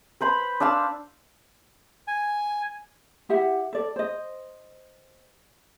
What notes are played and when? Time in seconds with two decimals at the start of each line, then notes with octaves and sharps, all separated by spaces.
0.21 B4 C5 B5
0.60 D4 F5 A5 E6
2.08 G#5
3.29 E4 G4 E5 F#5
3.73 A4 D5
3.96 C5 D#5